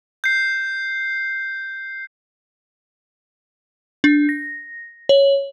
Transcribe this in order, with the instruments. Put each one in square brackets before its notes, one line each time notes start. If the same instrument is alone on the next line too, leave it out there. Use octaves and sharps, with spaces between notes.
[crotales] G6 C7
[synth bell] D4
A#6
C#5